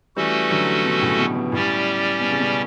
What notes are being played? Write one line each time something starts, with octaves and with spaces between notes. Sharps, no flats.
E3 G3 A3 C#4 F#4 A4
D3 F#3
B2 D3
A2 C#3
B2
B2
A2 G3 C#4 G4 D5
B2
C#3
B2